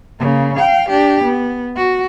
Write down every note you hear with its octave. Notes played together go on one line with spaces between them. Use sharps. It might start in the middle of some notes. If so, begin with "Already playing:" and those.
C#3 A#3
F5 G5
D4 G4
B3
F#4